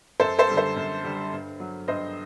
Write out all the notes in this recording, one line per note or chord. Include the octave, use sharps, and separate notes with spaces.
F#2 A4 C5
A4 C5
D3 G3
A4 C5
F#2
D3 G3
G2
F#3
G2 C5 D#5